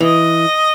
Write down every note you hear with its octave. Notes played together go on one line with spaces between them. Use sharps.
E3 D#5